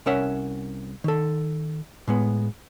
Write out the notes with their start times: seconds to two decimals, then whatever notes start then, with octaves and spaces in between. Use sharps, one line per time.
0.06 C2 C#4 A#4 C#5 E5 F#5
1.04 D#3 A4
2.08 A2 G#3 B3